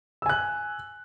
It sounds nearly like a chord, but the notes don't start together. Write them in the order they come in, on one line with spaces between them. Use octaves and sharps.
E6 G#5 F#6